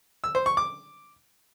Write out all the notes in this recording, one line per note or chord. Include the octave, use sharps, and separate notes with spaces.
E6
C5
C#6
D6